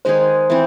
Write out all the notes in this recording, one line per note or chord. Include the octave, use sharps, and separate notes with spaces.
D#3 G#3 D#4 G#4 C5
E3 C4